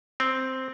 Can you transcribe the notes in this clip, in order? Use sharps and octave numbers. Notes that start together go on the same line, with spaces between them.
C4